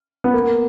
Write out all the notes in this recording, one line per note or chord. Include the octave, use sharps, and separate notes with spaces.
B3
A#3